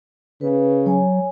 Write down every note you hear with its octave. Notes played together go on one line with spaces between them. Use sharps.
C#3 B4
F#3 C#5 G#5